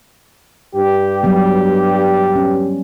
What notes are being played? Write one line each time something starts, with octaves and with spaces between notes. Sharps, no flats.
G2 G4
F#3 G3 B3
C#4